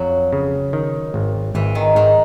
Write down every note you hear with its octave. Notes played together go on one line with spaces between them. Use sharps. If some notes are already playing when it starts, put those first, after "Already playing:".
Already playing: F2 F#3
C#3
D#3
G#1
G#1 E3
D#3
G#2 D#3